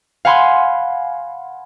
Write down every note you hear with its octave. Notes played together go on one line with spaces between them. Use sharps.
F5 F#5 G#5 B5 C6